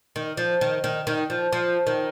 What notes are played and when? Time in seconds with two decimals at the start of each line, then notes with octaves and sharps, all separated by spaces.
0.16 D#3
0.37 F3
0.61 D#3
0.84 D#3
1.07 D#3
1.30 F3
1.52 F3
1.87 D#3